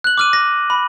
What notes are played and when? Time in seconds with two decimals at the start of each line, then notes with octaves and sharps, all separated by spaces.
0.04 F#6 F#7
0.18 D6 F6 D#7
0.33 A#6
0.70 B5